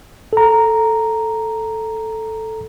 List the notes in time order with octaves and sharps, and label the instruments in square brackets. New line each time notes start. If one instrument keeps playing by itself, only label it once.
[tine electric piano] A4 A#5